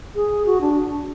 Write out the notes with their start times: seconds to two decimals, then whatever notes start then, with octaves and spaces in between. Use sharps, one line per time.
0.15 G#4
0.46 F#4
0.61 D4